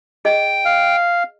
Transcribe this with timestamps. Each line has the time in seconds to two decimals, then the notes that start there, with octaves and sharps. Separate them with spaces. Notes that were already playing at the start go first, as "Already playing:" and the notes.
0.25 G#4 D#5 G5
0.65 F5